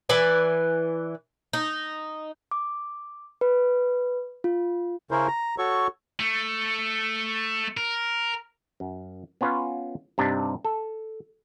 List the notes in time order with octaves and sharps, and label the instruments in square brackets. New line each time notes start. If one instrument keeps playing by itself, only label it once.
[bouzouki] E3 B4 D5 G#5
D#4
[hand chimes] D6
B4
F4
[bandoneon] C#3 C#4 E4 A#4 C5
A#5
F#4 A4 C#5 C#6
[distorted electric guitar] A3
A#4
[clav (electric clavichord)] F#2
B3 C#4 F4 B4 C#5
G2 C3 D4 D#4
A4